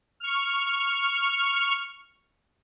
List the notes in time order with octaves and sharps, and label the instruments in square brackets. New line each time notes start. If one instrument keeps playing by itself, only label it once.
[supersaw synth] C#6 F6